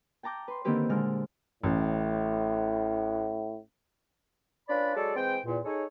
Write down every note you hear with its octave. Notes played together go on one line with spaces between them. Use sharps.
G5 A5 A#5 D6 G6
B4 C6
D3 D#3 A#3 C4 G4 B4
A#2 D3 G#3 A#4 F6
A1 A2
C#4 D4 F4 B4 D5 B5
F#3 G#3 A4 C#5 D5
E3 G#3 C4 G5
E2 A#2
D#4 G#4 A4 C#5